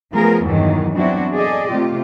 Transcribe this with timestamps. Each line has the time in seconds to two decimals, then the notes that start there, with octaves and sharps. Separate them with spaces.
0.12 F3 A3 B3 F4 G#4 A#4
0.45 E2 G2 B2 D#3 E3 F#3
0.96 F#3 B3 C4 D4 E4 F#4
1.34 G#4 A4 D5 D#5
1.71 C3 A3 F4 G4